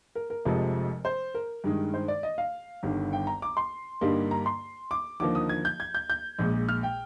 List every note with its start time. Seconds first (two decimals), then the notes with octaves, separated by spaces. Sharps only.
0.15 A#4
0.30 A#4
0.45 F1 F2 C3 F3 G#3
1.05 C5
1.35 A#4
1.64 G2 D#3 G#3
1.94 C5
2.08 D5
2.23 D#5
2.38 F5
2.83 G1 G2 D#3
3.13 G5
3.27 A#5
3.42 D6
3.57 C6
4.01 G2 D3 G3 A#3 D#4
4.31 A#5
4.46 C6
4.91 D6
5.20 D#2 D3 F3 A#3 D#4 D6
5.35 D#6
5.49 G#6
5.65 G6
5.80 G#6
5.95 G6
6.10 G6
6.39 A#1 A#2 G#3
6.69 F6
6.83 G5